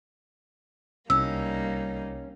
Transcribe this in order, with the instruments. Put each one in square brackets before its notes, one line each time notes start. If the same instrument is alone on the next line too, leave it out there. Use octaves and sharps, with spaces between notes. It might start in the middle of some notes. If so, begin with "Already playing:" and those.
[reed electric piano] C2 [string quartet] G3 A#3 D#4 [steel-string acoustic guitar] C#4 [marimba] E6